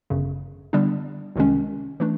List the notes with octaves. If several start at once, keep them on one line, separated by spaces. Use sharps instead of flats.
G1 F#2 C#3
D3 G3 B3 D4
C2 C3 D#3 G#3 C#4
E3 A3 D4